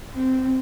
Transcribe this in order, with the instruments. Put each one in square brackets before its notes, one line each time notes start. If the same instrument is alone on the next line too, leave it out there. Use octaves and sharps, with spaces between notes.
[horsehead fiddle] C4